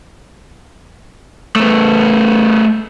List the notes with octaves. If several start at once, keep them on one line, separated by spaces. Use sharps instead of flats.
A3 B3